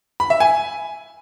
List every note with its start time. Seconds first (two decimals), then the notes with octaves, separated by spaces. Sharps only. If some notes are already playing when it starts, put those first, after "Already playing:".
0.20 B5
0.30 E5
0.40 G#5